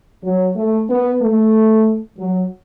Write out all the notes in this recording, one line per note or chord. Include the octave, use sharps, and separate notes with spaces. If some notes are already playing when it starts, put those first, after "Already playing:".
F#3
A3
B3
A3
F#3